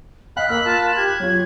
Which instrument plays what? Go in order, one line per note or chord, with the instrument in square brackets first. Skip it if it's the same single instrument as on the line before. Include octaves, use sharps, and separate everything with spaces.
[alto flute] D#5 [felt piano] F5 [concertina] B5 F#6
[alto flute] A#3 [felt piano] A#4 F6 [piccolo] E6
[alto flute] F4 [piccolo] A5
[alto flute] G4 [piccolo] G#6
[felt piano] F#3 F4 [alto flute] C#5